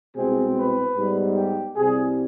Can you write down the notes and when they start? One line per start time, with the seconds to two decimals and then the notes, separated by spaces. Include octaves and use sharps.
0.16 C2 B2 G#3 C4 G#4
0.57 B4
0.96 G#2 G3 B3
1.36 G4
1.77 C2 C3 G3 G#4